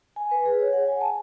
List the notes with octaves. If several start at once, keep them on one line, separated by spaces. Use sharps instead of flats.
G#5
B4
G#4
C#5
F#5
G#5
A5